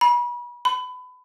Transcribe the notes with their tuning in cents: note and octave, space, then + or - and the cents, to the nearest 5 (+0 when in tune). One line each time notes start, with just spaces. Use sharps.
B5 -35
B5 +25